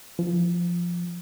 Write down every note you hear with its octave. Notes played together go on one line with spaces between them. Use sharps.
F3